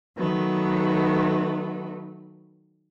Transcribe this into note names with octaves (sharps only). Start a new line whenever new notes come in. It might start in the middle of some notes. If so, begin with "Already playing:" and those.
D#3 F#3 A3 B3